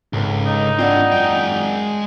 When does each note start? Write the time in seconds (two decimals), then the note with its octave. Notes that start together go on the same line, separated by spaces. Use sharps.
0.13 G#1 C#2 G#2 A4
0.46 D#4
0.79 C4 D4 F4 D5 F#5
1.12 F#2 G#3 G5 G7